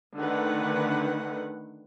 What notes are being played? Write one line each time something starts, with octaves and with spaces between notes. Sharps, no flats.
D3 D#3 A3 B4 F#5